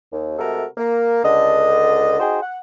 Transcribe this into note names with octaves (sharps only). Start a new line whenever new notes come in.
D#2
C3 G#3 A3 F#4 A4 A#4
A#3
C#2 D3 D#5
D#4 F#4 G#4 C5 D#5 G5
F#5